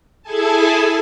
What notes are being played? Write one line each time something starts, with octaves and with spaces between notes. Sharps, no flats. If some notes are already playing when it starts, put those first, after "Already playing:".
E4 G#4 A4 G#5 A5